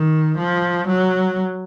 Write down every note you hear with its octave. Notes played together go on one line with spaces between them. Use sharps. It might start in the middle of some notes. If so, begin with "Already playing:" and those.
Already playing: D#3
F3
F#3